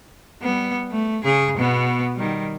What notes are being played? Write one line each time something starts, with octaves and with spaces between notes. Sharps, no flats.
G3 B3
A3
C#3 G#4
B2 B3
D#3 G3